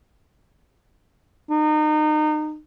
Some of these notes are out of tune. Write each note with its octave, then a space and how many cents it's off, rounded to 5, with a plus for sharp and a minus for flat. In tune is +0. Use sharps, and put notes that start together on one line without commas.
D#4 -30